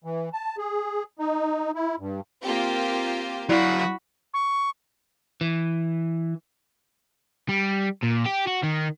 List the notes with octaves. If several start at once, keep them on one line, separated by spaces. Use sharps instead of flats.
E3
A5
G#4
D#4
E4
G2
A#3 C4 F4 G4
F#3 E4 F#4 D5 F5 B5
C#6
E3
G3
A#2
G4
F#4
D#3